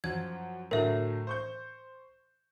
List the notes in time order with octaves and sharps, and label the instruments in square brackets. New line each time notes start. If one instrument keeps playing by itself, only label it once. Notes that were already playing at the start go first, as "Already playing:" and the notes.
[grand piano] F#2 F3 [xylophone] G#6
[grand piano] A2 D3 F#3 [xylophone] A#4 E5
[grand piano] C5 C#6 G6